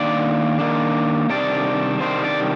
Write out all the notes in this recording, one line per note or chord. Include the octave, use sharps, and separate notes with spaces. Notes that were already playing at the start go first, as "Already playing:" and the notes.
Already playing: D#3 A#3 D4 D5
D#3 A#3 D4
C3 D#3 G3 D4 D5
C3 D#3 G3 D4 C5
D5